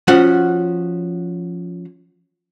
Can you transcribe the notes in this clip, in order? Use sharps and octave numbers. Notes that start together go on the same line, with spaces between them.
F3 C#4 F#4 F#5